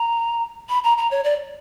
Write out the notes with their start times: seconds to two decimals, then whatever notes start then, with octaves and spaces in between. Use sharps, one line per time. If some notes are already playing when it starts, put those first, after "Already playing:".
Already playing: A#5
0.69 B5
0.84 A#5
0.98 A#5
1.11 C#5
1.24 D5